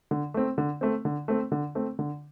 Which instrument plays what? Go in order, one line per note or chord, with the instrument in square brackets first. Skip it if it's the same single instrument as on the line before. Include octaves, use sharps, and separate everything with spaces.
[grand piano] D3
A3 C4
D3
A3 C4
D3
A3 C4
D3
A3 C4
D3